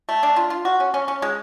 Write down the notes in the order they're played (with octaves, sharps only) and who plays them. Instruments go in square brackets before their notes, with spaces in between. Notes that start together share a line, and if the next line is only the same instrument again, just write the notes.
[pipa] A3
D4
F4
F4
F#4
C#4
C#4
C#4
G#3